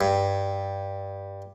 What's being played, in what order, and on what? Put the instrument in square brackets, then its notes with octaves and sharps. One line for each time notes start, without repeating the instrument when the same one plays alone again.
[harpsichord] G2